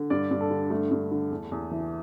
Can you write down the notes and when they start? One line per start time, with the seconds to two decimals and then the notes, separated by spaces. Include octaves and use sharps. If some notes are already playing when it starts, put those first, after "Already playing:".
Already playing: D3
0.10 G2 D5
0.31 G2
0.41 A4
0.51 D3
0.70 G2 A3
0.91 G2
1.12 D3
1.31 E2
1.52 E2
1.71 E3